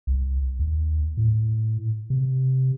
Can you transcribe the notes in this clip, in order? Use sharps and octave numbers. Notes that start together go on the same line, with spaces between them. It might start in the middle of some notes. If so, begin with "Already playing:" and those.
C2
D#2
A2
C3